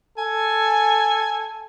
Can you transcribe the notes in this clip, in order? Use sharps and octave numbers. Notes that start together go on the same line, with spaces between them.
A4 G#5